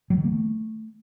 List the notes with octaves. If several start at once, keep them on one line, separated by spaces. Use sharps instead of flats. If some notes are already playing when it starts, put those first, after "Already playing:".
F#3
D#3
A#3
A3